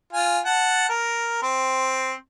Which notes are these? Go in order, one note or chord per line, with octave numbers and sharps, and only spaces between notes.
F4 G#5
F#5 A5
A#4
C4